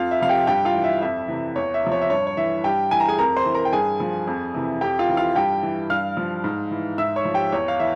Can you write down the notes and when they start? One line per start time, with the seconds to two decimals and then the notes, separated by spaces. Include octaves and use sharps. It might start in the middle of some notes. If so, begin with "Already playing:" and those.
Already playing: F2 F4 F5
0.11 E5
0.20 C3 F3 F5
0.29 G4 G5
0.47 G2 G4 G5
0.65 F4 F5
0.74 E3
0.84 E5
1.02 F2 E5
1.28 C3 E3
1.56 E2 C#5
1.74 E5
1.83 C3 F3
1.92 C#5
2.02 E5
2.10 G2 C#5
2.27 C#5
2.37 E3 E5
2.64 G2 G4 G5
2.91 E3 G#5
3.00 A#5
3.09 G#4 G#5
3.19 F2 A#4 A#5
3.37 C5 C6
3.46 E3
3.54 A#4 A#5
3.65 G5
3.73 G2 G#4 G#5
4.00 F3
4.27 F2
4.54 C3 E3
4.81 F2 G4 G5
4.99 F4 F5
5.09 E3
5.17 F4 F5
5.36 G2 G4 G5
5.63 E3
5.90 G2 F5 F6
6.17 F3
6.44 G#2
6.71 E3
6.98 G#2 E5 E6
7.16 C#5 C#6
7.25 F3
7.34 G4 G5
7.52 E2 C#5
7.68 F5
7.80 E3 E5